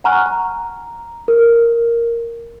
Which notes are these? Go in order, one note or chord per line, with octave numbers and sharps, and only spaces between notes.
F#5 G#5 A#5 C#6 F6 F#6
A#5
A#4